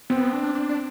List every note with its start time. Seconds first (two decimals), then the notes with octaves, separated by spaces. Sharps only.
0.10 B3 C4
0.33 D4
0.55 D4
0.69 D4